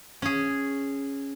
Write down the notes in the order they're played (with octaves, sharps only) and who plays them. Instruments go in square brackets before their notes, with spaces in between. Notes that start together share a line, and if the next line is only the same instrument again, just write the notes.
[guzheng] C#4 G#4